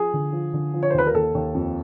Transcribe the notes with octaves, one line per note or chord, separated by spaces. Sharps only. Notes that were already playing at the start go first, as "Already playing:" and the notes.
Already playing: F3 G#4
D3
F3
D3
F3
C#5
C5
D#2 B4
A#4
D#2 A4
D#2
F2